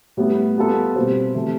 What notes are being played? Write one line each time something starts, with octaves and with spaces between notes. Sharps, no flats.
A2 G3 B3
G3 B3 F4 A4
B2 G3 C4
C3 E3 A3